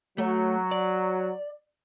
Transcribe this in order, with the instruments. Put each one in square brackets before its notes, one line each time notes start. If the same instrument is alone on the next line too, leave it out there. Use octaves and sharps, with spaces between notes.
[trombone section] F#3 [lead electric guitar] A3
[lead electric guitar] D5